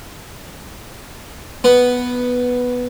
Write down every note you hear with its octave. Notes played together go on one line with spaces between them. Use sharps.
B3